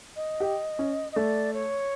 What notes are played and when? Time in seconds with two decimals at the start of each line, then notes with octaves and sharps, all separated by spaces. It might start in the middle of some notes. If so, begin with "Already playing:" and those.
0.15 D#5
0.40 G4
0.79 C#4
1.12 D#5
1.16 A3 D5
1.53 C#5